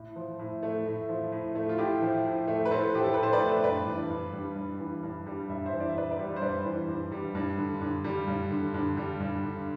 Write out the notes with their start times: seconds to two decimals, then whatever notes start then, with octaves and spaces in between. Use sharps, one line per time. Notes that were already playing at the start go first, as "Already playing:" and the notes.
Already playing: A2
0.16 F3
0.39 A2
0.63 A3
0.86 A2
1.09 F3
1.32 A2
1.55 A3
1.69 F4
1.78 A2 E4 G4
2.02 F3
2.25 A2
2.48 A3
2.65 B4
2.71 A2 A4 C5
2.94 F3 G4
3.04 A4
3.14 A2 B4
3.23 C5
3.33 B4 D5
3.40 A3
3.64 G2 B4 D5
3.87 E3
4.10 G2
4.33 G3
4.56 G2
4.80 E3
5.03 G2
5.26 G3
5.49 G2 E5
5.66 C5 E5
5.72 E3
5.80 D5
5.89 E5
5.96 G2 B4 D5
6.11 B4 D5
6.19 G3
6.36 C5
6.42 G2 B4 D5
6.65 E3
6.88 G2
7.12 G3
7.35 G2
7.58 D3
7.81 G2
8.04 G3
8.28 G2
8.51 D3
8.74 G2
8.97 G3
9.20 G2
9.43 D3